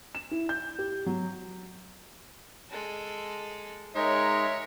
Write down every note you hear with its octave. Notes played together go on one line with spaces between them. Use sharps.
E7
E4
G6
G4
F#3
G#3 A4
G#3 D#4 A#4 C#5 E5